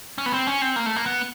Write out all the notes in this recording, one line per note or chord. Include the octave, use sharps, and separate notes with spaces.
C#4
B3
C4
C#4
C4
A#3
A3
A#3
B3